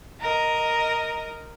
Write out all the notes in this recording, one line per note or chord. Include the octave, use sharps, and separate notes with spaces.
A#4 D#5